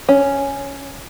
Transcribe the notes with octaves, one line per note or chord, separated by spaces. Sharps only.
C#4